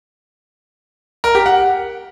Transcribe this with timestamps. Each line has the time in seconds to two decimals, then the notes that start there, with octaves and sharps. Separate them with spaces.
1.24 A#4
1.35 G4
1.46 F#5